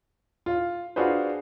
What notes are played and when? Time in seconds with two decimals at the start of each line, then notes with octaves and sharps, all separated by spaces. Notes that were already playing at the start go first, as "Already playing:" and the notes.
0.46 F4
0.96 D4 F4 F#4 G#4 B4 C5